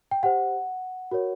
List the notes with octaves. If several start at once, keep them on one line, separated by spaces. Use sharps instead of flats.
G5
G4 C5 F#5
F#4 A#4 C#5